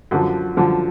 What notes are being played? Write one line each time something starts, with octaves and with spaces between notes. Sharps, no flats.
F#2 D3 F3
F#2 D3 F3